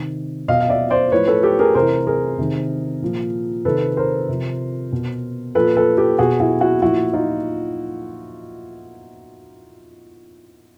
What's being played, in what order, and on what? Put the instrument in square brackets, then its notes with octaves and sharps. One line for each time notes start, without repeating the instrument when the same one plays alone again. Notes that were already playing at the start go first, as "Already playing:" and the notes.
Already playing: [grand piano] C3 D#3
B2 D#5 F5
F5
D5 E5
C5 D5
A2 F3 B4 C#5
A4 B4
G4 A4
G#4 A#4
C3 E3 A#4 C5
G#4 A#4
C3 D#3
A#2 F3
C3 D#3 A4 B4
A#4 C5
C3 F3
B2
A#2 F3 A4 B4
A4 B4
G4 A4
B2 F#4 G#4
E4 F#4
E4 F#4
A#2 F3 E4 F#4
D#4 F4